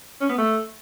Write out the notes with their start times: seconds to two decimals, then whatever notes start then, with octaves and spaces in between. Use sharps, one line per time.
0.21 C#4
0.29 B3
0.38 A3